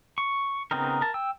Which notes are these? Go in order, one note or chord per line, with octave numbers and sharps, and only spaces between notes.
C#6
C#3 B3 C4 D#4 A#4
A#4 A5
G5 E6